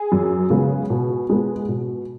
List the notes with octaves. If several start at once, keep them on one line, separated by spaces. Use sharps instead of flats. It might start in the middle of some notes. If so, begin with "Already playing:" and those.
Already playing: G#4
F#2
C#3 G#3 B3
B2
G#3 B3
B2